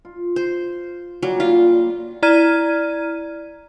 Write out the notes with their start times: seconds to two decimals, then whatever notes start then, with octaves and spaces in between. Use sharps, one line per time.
0.05 F4
0.36 C5
1.23 A#2 F#3 G3 A#3
1.40 F4
2.22 E4 D5 A#5 F6 G#6 D#7